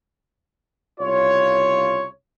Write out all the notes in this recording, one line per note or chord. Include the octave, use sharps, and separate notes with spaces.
C2 C#3 F4 C#5